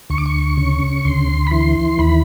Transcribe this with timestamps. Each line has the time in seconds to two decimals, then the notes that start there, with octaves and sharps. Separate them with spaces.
0.10 D2 C#6
0.18 D6
0.26 C#6
0.57 C#3
1.05 D2 C6
1.47 B5
1.51 E3 C6
1.99 D#2 B5